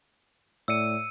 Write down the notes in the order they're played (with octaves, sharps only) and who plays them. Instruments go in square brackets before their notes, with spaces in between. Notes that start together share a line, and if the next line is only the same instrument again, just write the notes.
[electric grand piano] A2 D5 C#7 [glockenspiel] E6 D#7